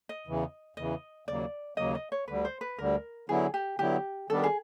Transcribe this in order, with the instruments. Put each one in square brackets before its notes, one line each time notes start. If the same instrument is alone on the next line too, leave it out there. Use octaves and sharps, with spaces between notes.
[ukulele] D#5
[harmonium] E2 C#3 E3
[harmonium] E2 C#3 E3 [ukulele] D#5
[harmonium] D#2 C#3 F#3 A#3 [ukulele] D5
[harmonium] D#2 C#3 F#3 A#3 [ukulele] D#5
[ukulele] D#5
C#5
[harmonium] D2 D3 G3 [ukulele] B4
[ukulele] C5
B4
[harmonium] D2 D3 G3 [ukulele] A#4
[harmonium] D3 F#3 B3 E4 [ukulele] G#4
[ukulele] G4
[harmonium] D3 F#3 B3 E4 [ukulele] G4
[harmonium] D#3 G3 B3 D4 G4 [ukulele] A4
[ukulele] G#4